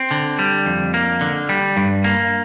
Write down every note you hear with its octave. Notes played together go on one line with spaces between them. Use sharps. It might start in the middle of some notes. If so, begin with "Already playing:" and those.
Already playing: C4
D3
G3
F2
A#3
D3
G3
G2
A#3